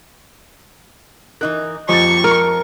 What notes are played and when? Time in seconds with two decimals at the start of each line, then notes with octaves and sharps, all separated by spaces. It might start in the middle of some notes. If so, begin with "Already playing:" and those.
1.41 E3 D#4 A#4 F#6
1.89 F2 A#3 G4 D#5 C#6 A6
2.24 A#4